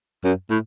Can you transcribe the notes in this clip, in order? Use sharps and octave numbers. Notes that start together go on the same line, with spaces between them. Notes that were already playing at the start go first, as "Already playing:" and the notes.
F#2
A2